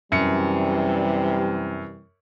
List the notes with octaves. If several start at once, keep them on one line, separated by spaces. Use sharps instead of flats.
F#2 C3 E3 G3 C#7